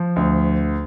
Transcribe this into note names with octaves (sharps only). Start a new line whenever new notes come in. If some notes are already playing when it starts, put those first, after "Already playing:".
Already playing: F3
D2